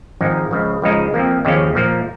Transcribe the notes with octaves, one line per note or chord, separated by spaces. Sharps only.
G#1 G#2 F3 G#3 D#4
C#2 C#3 F3
C#2 C#3 F3 G#3 D#4
F2 F3 A#3
D#2 C#3 F3 C#4
A#2 F3 A#3